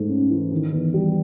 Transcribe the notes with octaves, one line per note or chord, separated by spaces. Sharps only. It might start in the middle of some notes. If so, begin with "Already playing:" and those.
Already playing: G#2 A3
C#4
E3
D#3
E2
G3